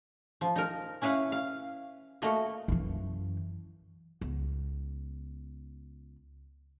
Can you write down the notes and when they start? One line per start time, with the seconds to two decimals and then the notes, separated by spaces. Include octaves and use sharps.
0.41 F3
0.56 D#4 A#4
1.02 C#4 E4 B4 F5 F#5
1.32 F5
2.22 A3 A#3 F#4 D#5
2.68 F#2 E3
4.21 C#2 B3